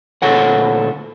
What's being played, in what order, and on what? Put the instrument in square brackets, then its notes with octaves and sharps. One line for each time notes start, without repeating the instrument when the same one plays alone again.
[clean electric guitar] D2 A#2 A4 C#5 F#5